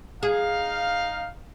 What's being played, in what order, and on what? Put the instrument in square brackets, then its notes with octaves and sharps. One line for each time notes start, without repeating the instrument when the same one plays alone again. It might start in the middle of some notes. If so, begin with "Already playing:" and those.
[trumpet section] D#4 F5 [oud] G#4